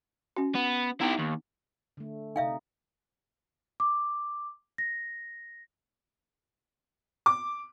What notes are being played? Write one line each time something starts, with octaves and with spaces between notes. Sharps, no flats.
C#4 F#4
B3
B3 D#4 E4 G4
D#2
D3 A3
C3 D#4 E5 F5 G5
D6
A#6
D6